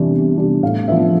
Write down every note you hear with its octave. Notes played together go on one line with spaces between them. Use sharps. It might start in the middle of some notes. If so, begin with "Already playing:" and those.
Already playing: E2 C3 E3 G3 D4
E2
C3 E3 G3 D4
A2 F5
F3 B3 D4 E5